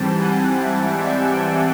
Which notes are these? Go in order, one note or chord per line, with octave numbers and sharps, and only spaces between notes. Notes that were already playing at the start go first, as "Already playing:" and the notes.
Already playing: G#2 E3 G3 C4 G5 A5
F#5 G#5
E5 F#5
D5 E5